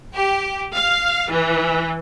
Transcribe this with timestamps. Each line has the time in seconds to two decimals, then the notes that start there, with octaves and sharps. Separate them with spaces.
0.14 G4
0.74 F5
1.29 E3